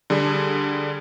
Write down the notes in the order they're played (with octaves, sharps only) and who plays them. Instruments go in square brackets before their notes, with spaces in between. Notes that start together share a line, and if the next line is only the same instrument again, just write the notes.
[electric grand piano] D3 G3 G#4